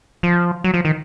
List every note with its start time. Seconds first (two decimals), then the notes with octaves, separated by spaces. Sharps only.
0.23 F3
0.64 F#3
0.74 F3
0.85 D#3